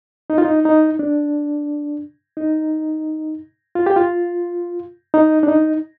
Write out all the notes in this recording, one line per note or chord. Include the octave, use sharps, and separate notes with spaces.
D#4
F4
D#4
D#4
D4
D#4
F4
G4
F4
D#4
D4
D#4